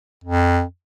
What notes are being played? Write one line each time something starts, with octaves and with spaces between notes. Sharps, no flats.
F2